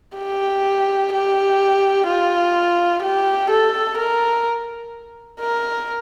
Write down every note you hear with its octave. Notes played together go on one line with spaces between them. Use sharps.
G4
G4
F4
G4
A4
A#4
A#4